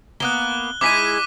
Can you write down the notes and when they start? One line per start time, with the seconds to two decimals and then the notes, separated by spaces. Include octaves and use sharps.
0.20 A#3 B3 F#6 G7
0.81 G#3 D#4 E4 D6 B6 D#7